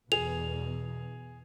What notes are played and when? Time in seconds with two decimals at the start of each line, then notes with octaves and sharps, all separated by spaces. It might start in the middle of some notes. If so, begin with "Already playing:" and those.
0.12 E2 B2 G#4 F7